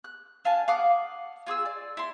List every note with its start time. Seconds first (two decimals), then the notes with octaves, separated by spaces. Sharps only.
0.04 F#6
0.45 D4 F5 G#5 A5
0.68 F5 F#5 D6 D#6
1.47 F4 G#4 D#6 E6
1.65 D5
1.97 E4 C6